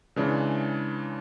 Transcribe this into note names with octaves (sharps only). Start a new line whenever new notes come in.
C#3 E3 G#3 D4